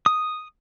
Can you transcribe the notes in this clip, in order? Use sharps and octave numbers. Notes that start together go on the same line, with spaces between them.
D#6